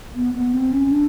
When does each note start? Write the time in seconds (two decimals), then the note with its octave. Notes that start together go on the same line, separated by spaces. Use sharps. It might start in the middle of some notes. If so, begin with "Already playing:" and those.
0.15 B3
0.34 B3
0.54 C4
0.72 C#4
0.91 D4